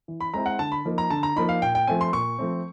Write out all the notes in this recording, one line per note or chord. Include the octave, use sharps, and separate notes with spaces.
E3
B5
G#3 C4 E4 A#5
F#5
D3 A5
B5
F3 A#3 D#4
A#5
D3 A5
A#5
F3 A#3 D#4 B5
F5
A#2 G5
G5
F3 A3 C4 G#5
C6
A#2 C#6
F3 A3 C4